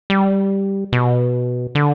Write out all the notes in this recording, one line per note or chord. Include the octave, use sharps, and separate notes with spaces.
G3
B2
D3